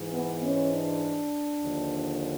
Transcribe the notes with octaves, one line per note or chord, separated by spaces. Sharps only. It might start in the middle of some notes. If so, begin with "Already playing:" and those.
Already playing: G#2 E3
B3
C#4
D4
D#2 D3 F3